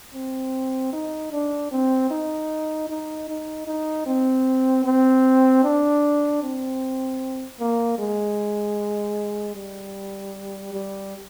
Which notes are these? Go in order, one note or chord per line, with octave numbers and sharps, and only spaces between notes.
C4
D#4
D4
C4
D#4
D#4
D#4
D#4
C4
C4
D4
C4
A#3
G#3
G3
G3